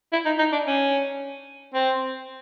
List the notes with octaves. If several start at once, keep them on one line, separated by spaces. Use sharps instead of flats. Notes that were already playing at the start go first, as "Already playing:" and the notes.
E4
D#4
D#4
D4
C#4
C4